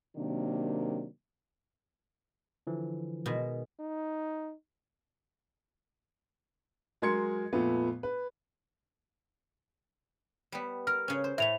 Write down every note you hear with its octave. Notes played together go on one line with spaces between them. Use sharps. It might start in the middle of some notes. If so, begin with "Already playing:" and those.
C3 D#3 F#3 A#3 D4
D3 E3 F3
B2 D#3 G#3
D#4
F#3 G#3 A#4 C6 G#6 C#7
F2 A#2 A3 B3
B4
G3 B3
A#4 F6
C#3 C#4
C5
A2 A3 E5 F7